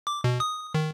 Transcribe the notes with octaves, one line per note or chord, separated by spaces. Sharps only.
D6
B2
D#6
D#3